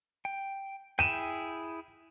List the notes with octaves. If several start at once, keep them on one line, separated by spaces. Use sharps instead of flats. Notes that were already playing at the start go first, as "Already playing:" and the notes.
G5
E4 G#4 G5 D#7 E7